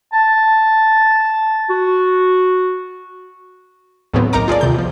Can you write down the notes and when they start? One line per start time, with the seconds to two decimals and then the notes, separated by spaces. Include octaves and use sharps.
0.13 A5
1.70 F#4
4.13 D#2 A2 C#3 F#3 B3 C4
4.33 B1 D#4 A#4 A#5 D6
4.48 F4 G#4 A4 D5
4.61 D#2 C3 G6
4.74 B2 F3